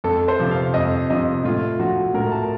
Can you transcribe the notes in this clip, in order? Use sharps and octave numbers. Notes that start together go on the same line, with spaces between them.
F2 A4
C5
C3 F3
F5
F2 D#5
C3 F3 D#5
A2 F4
F3 F#4
A2 A#4
A5